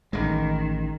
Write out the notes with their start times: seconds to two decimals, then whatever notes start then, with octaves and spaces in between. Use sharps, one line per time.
0.13 A1 D#3 G#3